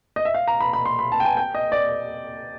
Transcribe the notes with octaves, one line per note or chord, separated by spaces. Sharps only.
D#5
E5
F5
A#5
B5
B5
C6
B5
A5
G5
G#5
G5
D#5
D5